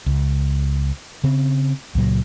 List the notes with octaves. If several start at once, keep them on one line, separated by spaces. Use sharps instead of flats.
C#2
C#3 C4
C#2 A#2 F#3